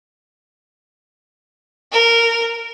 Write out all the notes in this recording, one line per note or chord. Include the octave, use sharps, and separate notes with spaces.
A#4